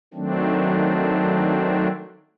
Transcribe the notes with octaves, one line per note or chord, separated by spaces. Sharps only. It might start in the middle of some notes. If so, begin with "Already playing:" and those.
D#3 F#3 A3 C4 D4